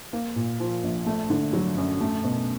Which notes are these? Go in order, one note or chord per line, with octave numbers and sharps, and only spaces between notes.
A#3
A#2
F3
A#1
A3
D3
F#3
F#2
A3
B2